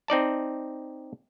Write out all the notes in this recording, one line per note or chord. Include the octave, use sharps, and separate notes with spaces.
C4 D#4 D5 A5